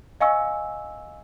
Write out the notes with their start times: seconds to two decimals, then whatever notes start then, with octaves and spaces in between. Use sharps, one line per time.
0.21 D#5 F5 G#5 C#6 E6